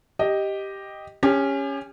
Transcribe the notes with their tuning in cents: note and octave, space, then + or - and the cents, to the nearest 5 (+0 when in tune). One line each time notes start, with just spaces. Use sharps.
G4 +0 D#5 +0
C#4 +0 G4 +35